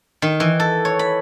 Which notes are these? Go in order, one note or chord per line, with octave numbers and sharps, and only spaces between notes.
D#3
E3
A4
C#5
B5